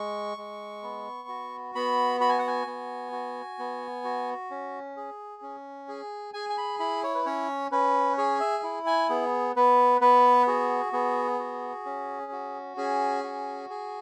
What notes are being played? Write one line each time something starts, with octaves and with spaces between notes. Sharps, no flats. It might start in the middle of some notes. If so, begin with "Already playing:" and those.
Already playing: G#3 C#6
G#3
B3
F#4
B3 B5
F#4 B5
G#5
F#5
G#5
B3
F#4
B3
F#4
C#4
G#4
C#4
G#4
G#4 G#5
G#5
B5
E4 B5
C#5
B4
C#4 C#5
C#4 B4
G#4 C#5
E5
E4
G#5
B3 G#4
B3 B4
B3 B4
F#4 G#4
B3 G#4
F#4
C#4
F#4
C#4 G#4
F#4
G#4